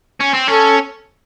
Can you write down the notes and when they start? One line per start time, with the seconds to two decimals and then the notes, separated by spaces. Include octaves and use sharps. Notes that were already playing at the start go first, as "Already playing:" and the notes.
0.21 C#4
0.34 C4
0.48 C#4 A4